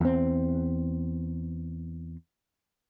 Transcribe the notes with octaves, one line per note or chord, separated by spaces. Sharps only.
E2 C4